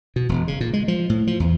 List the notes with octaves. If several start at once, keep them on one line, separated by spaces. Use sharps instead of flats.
B2
E1
C#3
A#2
G#3
F3
A2
F3
E2